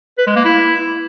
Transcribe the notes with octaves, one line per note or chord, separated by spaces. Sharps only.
B4
G#3
A#3
E4